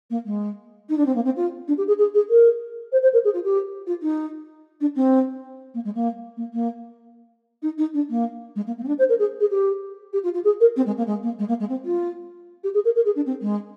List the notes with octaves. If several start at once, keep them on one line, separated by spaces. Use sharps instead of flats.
A#3
G#3
D#4
D4
C4
A#3
C4
F4
D4
G4
G#4
G#4
G#4
A#4
C5
C5
A#4
G#4
F4
G4
F4
D#4
D4
C4
A#3
G#3
A#3
A#3
A#3
D#4
D#4
D4
A#3
G#3
A#3
A#3
C4
D4
C5
A#4
G#4
G#4
G4
G4
F4
F4
G#4
A#4
C4
G#3
A#3
G#3
A#3
G#3
A#3
G#3
C4
F4
G4
G#4
A#4
A#4
G#4
D4
C4
G#3